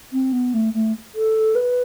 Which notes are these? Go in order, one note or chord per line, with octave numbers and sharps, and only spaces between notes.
C4
B3
A3
A3
A4
B4